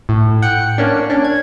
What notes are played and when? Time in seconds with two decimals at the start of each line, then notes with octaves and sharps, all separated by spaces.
0.09 A2
0.42 F#5 G5 F#6 C#7
0.78 A#3 C#4 D4
1.10 C#4 D4
1.24 G#6